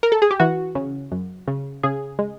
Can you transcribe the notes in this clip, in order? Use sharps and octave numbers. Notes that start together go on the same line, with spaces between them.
A#4
A4
G#4
G4
E3 F#4
C#3
F#2
C#3
C#3 G#4
G#3